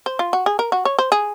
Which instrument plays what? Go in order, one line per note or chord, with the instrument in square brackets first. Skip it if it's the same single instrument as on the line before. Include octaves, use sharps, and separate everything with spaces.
[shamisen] C5
F4
F#4
G#4
A#4
F#4
C#5
C5
G#4